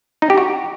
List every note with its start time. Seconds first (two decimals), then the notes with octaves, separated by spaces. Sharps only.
0.22 D#4
0.30 G4
0.38 F#4